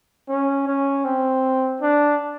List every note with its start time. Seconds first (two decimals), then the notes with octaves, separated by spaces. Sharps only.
0.29 C#4
0.67 C#4
1.04 C4
1.81 D4